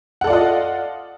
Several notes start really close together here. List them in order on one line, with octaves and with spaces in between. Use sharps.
F#5 A4 D5 F4 D#5